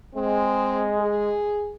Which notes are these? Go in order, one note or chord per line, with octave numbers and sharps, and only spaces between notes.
G#3 C4
G#4